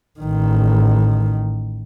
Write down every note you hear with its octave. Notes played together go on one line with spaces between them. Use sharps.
A1 D#3